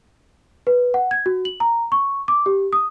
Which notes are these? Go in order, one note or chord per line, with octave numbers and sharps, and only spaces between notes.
B4
F#5
G#6
F#4
F#7
A#5
C#6
D6
G4
D#6